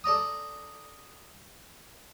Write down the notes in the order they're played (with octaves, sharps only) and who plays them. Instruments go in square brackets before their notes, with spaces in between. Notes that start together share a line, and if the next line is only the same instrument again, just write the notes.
[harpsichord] A4 D5 A#5 D#6